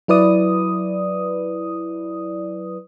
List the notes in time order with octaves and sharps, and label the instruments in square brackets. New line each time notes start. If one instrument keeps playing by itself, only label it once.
[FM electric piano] F#3 E4 B4 D5 D#6